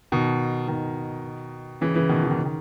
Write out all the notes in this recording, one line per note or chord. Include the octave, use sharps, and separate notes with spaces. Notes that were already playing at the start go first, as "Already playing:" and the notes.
B2 D#3
B2 D#3
C#3 E3
C#3 E3
B2 D#3
E3
D#3
C#3
D#3